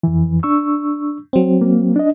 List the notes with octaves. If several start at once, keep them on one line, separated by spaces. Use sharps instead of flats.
F2 E3
D4 C#6 E6
F#3 C4
A#3
D4 D#5